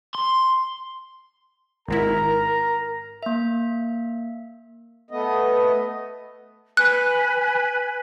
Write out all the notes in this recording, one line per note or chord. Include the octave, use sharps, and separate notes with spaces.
C6
G#1 G#2 E4 A#4 A#5
A#3 E5
A3 B3 D#5
B4 G#5 F#6